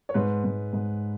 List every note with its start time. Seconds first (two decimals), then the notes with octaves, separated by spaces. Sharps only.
0.09 C#5
0.14 G#2 B4
0.44 G#2
0.73 G#2